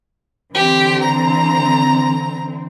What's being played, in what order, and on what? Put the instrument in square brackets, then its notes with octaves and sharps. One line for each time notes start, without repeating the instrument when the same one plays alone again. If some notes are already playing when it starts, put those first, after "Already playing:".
[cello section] D3 E3 C4 [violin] G4
[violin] A#5